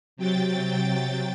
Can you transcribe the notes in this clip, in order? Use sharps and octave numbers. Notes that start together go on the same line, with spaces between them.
C3 F#3 G5 A6